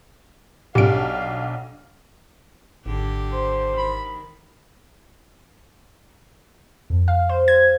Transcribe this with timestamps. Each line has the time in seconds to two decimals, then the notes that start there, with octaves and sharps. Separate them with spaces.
0.75 B1 D4 G4 F5 D7
2.86 G#1 D3 G4
3.33 C5
3.78 D#3 B5
6.90 F2
7.08 F5
7.29 C5
7.48 G#6